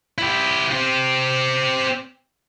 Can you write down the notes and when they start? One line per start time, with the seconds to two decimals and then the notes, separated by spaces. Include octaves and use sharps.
0.18 E4 G4
0.72 C4 G4